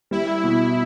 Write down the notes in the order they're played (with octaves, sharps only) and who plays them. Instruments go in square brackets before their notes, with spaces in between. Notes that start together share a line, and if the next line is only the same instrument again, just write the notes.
[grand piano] G3 [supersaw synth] E4
[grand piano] B2